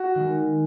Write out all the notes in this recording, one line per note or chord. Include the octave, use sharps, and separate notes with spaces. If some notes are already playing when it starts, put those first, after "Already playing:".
Already playing: F#4
D#3 G#3